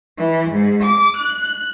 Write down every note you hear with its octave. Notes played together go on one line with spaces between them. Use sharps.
E3
G#2
D6
F#6